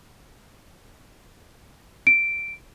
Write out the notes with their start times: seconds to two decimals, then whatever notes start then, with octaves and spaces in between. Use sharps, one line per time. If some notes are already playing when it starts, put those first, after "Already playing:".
2.07 D7